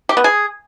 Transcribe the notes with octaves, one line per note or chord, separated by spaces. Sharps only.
G4
B3
G#4